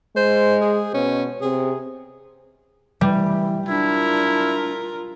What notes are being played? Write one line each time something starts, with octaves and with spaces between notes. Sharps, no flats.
G#3 C5
G#4
B2 C#4
C3 G#4
E3 G3
D4 E4 F4 A#4